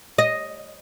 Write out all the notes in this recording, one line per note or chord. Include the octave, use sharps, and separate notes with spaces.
D#5